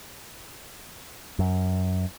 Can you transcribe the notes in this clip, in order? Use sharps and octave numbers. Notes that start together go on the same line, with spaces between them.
F#2